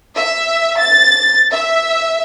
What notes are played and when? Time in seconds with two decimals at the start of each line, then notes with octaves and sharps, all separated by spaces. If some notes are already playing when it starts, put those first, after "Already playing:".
0.16 E5
0.78 A6
1.52 E5